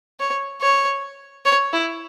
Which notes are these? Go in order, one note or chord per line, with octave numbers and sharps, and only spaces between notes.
C#5
C#5
C#5
E4